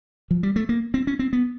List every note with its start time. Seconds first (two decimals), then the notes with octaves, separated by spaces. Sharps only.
0.31 F3
0.43 G3
0.56 A3
0.69 A#3
0.94 C4
1.07 C#4
1.19 C4
1.33 B3